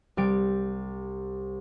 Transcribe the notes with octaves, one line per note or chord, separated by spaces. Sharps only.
C2 G3 D7